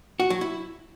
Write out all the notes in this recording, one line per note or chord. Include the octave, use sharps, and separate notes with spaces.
F#4
F#3
E4